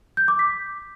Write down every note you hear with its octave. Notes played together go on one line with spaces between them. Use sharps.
G6
D6
B6